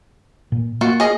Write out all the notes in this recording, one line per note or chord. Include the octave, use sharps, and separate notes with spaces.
A#2
A#3 F4 F#4
G#4 D#5